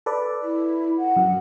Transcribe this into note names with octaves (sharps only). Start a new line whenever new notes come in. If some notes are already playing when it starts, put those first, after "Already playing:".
A4 B4 D5
E4
F#5
F#2